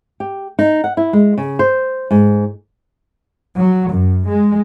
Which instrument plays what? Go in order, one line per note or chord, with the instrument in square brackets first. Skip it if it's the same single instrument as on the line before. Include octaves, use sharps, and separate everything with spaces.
[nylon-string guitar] G4
D#4
F#5
E4
G#3
C#3
C5
G#2
[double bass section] F#3
F#2
G#3